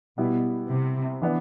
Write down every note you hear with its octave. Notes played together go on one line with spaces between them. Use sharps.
B2 G3 B3 E4
C3
E3 B3 D4